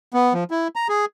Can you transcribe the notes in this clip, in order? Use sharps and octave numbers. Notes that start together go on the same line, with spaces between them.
B3
F3
E4
A#5
G#4